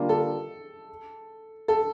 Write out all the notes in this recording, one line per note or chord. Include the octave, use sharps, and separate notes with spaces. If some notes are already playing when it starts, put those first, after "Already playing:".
Already playing: D3 G3 A#3 D4 F4
A4
A4